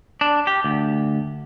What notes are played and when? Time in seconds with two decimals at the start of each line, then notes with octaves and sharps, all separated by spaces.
0.21 D4
0.47 G4
0.64 D2